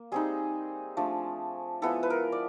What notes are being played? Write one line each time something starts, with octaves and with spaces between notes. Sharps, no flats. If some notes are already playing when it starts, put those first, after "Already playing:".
Already playing: A#3
G3 C4 D#4 G#4
F3 A3 D4
F3 G#3 B3 E4 A4
B4
A#4
D5